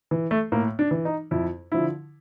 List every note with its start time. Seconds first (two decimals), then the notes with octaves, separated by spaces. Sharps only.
0.11 E3
0.31 A3
0.52 A2 A#3
0.79 D4
0.91 E3
1.05 D#4
1.31 F2 E4
1.72 D3 F3 E4